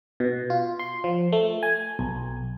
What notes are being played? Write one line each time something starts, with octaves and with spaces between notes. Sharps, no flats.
B2
F4
C6
F3
A3
G#5
B1